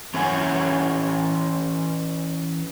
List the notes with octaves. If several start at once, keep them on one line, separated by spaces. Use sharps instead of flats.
E3 C#4 C#5 E5 F#5 G#5